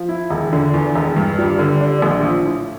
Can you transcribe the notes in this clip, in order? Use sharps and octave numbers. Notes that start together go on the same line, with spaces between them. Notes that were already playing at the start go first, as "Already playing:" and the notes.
Already playing: F3
E4
E1
D3
E2
E1
G2
G3
D3
D4
A#1
F3
A2